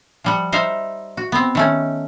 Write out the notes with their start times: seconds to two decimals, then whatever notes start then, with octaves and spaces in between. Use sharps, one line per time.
0.24 F3 G3 F#5
0.52 D#4 C5 E5 F5
1.17 F#4
1.32 B3 C4
1.55 D#3 A3 C#4